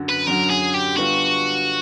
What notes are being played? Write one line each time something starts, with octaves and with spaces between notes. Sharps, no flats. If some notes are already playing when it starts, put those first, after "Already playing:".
Already playing: F#2 D3 F#3
B4
F#2 D3 F#3 A#4
G#4
G4
D3 G3 B3 D4 F4 F#4